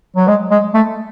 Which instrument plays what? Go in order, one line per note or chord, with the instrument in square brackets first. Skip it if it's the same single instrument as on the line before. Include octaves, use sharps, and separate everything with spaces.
[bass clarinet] F#3
G#3
G#3
A3